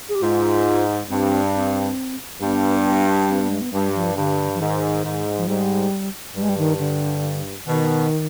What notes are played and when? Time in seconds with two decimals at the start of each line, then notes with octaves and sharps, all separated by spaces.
0.09 G#4
0.15 G4
0.22 G#2 F4
1.10 G2 C4
1.55 C4
2.41 G2 B3
3.29 C4
3.40 B3
3.50 G#3
3.61 B3
3.73 G2 G3
3.95 F3
4.16 G2 D3
4.54 F3
4.60 G#2 D#3
5.04 G#2
5.38 F3
5.47 G#2 G3
6.36 G2 G3
6.42 G#3
6.49 G3
6.58 D#3
6.79 D3
7.66 B2 D#3